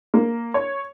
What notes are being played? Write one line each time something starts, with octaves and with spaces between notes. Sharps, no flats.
A#3
C#5